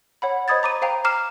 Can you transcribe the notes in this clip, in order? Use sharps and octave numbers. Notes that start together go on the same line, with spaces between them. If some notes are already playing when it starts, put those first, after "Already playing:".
C#5 F#5 B5
C5 D#5 B5 D#6 G#6 A6
A#5 D6 D#6 D#7
C5 F5 G5 A#5
A#5 D6 F6 C7 E7